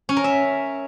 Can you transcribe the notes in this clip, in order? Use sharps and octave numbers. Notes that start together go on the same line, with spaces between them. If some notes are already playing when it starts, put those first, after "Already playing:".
C#4
A#4
E5